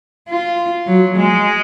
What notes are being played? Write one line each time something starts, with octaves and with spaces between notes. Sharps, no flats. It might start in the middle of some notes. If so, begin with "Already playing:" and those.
F4
F#3
G#3